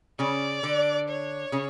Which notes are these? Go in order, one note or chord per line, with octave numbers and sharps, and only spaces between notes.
C#3 C#4 D5
D3 D4
C#5
C#3 C#4